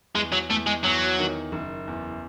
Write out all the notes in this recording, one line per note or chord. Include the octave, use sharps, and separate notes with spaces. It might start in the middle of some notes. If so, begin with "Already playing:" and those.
E2 G#3
F#3
E2 A3
G#3
E2 F#3
D#3
F#1
E2